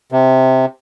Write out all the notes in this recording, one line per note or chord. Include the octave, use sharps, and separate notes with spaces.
C3